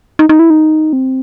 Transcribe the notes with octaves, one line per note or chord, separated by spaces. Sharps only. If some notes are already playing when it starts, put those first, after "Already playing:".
D#4
D#4
E4
D#4
C4